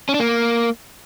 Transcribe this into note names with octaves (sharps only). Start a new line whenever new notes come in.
C#4
D4
A#3